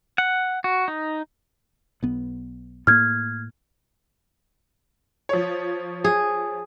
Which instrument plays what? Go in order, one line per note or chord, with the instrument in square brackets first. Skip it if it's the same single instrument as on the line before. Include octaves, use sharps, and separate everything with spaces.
[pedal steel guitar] F#5
F#4
D#4
[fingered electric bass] B1 B3
[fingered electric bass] A2 A#3 [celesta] F6 G#6
[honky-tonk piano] F3 C#5
[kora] G#4